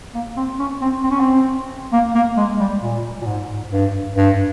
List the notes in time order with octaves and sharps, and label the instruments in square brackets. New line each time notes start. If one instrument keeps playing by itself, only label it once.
[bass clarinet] A#3
C4
C#4
C4
C4
C#4
C4
A#3
A#3
G#3
G3
A#2
A#2
G#2
G2
G2